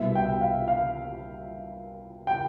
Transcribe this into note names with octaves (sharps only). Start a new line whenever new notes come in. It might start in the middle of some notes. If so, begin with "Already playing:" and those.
Already playing: C2 B2 E5
G5
F5
F5
G5